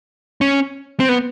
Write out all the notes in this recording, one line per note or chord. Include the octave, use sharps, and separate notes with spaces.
C#4
C4
B3